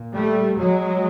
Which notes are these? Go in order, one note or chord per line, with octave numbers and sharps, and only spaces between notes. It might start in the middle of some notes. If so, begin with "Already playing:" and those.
Already playing: A#2
G3 A3
F#3 G#3